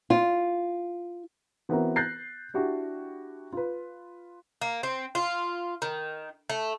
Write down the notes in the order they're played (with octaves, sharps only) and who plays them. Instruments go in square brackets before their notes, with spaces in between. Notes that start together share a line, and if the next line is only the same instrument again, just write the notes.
[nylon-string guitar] F4
[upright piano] E3 B3 C4 E4 F#4 A#4
F#6 G6 A6 A#6 C7
D4 E4 F#4 G4
F4 B4
[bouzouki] A#3
C4
F4
D#3
A3